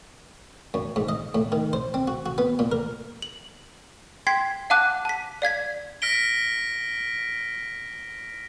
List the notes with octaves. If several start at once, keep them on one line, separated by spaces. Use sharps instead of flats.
F#2
G#2
D#5
A2
D#3
C5
C4
F#4
F#4
B3
A#2
A#4
F#7
G5 C6 G#6 B6 C7
F5 F#5 A5 D6 F#6
A5 B6
D5 F5 G#6 B6
F6 A#6 B6 D7 G7